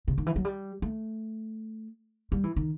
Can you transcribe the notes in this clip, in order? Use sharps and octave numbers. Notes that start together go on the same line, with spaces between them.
C3
D#3
E3
F#3
G3
A3
G3
E3
D#3